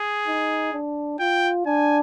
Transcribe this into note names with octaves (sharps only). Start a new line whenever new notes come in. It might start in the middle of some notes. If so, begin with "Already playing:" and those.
Already playing: G#4
D#4
D4
F4 G5
D4 G#5